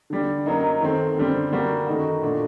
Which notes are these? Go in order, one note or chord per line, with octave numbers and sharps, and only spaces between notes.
D3 G3 D4
F#2 F#3 A#3 D#4
D#3 A3 C4
F#2 D3 G3 C4
D3 G3 A#3 F#4
F#2 D#3 A3 D#4 F#4
A#2 A3 D4 F#4